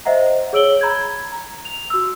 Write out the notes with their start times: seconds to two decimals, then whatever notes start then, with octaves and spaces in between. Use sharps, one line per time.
0.05 C5 D#5 E5 F#5 A#5
0.53 G#4 C#5 E6 D7 F#7 G7
0.81 A#5 B5 G6 G#6
1.32 A#5
1.65 F7
1.90 F#4 E6